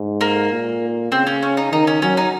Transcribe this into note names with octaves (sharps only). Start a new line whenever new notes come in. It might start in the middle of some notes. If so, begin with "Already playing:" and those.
Already playing: G#2
A#3
A#2
C#3 C4
C#4
C#4
D#4
D#3 D#4
C#4
F#3 C#4
D#4